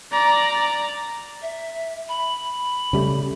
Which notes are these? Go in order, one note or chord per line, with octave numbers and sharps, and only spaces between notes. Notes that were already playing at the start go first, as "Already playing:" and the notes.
D5 A#5
E5
B5
C#3 G3 A3